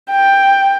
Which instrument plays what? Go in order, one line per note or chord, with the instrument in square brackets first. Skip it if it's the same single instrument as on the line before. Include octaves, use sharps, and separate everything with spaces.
[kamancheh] G5